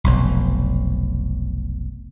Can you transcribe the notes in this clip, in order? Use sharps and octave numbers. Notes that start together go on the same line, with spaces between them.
F1 B1